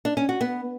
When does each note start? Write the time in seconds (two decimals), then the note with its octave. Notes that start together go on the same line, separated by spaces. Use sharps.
0.05 D4
0.17 C#4
0.29 F#4
0.41 B3